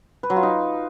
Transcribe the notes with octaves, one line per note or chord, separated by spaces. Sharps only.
B4
F#3
F4
D#4